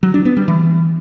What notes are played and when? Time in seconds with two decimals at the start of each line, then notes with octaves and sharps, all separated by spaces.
0.03 F#3
0.14 D4
0.25 B3
0.37 G3
0.48 E3